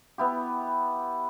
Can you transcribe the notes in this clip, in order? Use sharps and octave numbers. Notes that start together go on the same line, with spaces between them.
B3 E4 G4